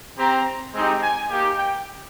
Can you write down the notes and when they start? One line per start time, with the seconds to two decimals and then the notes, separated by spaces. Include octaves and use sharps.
0.18 C4 G4 A#5
0.74 G#3 C4 D#4 G4
1.03 G#5
1.31 A#3 D#4 G4
1.59 G5